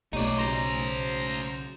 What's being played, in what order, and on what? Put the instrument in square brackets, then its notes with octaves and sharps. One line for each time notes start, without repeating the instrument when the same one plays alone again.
[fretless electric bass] B1 [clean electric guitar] A3 G4 C#5 [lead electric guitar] D#4 D5
[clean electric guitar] C#3 F#3 [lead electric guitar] F#4 C5 [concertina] A#5